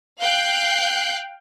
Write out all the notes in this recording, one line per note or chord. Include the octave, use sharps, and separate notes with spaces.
F5 G5 F#6 G6 C7